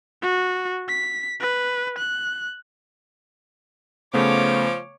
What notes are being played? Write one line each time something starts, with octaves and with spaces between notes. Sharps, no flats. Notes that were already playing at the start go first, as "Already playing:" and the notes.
F#4
B6
B4
F#6
C#3 F3 A3 B3 C#5 D6